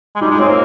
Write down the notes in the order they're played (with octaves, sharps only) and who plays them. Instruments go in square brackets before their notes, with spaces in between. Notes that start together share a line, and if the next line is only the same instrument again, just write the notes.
[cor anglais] G#3
[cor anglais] G3 [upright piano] D#4
[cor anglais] G#3 [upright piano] F4
[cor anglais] C4 [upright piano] C#5
[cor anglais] A#3 [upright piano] C5